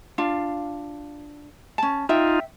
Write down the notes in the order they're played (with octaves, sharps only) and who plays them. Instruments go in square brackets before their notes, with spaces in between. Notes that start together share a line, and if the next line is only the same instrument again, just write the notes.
[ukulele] D4 F4 F5
C#4 A5
[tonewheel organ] D#4 F4 [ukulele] E5 G5